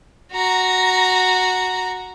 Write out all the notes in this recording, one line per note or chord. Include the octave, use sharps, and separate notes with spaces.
F#4 A#5